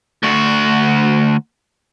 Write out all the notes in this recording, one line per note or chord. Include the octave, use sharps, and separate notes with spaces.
D2 F#4